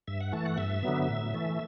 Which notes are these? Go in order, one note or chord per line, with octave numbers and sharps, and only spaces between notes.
G2 E5
F#5
E3 A3 A5
F#5
G2 E5
D3 F#3 B3
A2
E3 A3